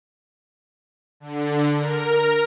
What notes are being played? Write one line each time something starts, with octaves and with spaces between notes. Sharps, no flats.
D3
A#4